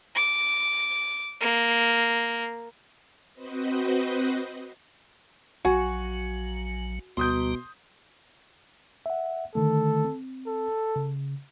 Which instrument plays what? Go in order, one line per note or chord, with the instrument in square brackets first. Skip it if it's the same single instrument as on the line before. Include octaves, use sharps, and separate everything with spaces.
[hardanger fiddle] D6
A#3
[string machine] C4 F#4 B4 C5 D#5
[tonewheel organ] A#1 F#3 [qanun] F#4 [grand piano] G#5
[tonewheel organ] D2 G3 A#5 [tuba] B2 [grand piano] C6 D#6 G6
[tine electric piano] E5 F#5
[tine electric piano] D3 D#3 A3 [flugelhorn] A4
[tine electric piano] C4
[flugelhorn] A4
[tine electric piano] C#3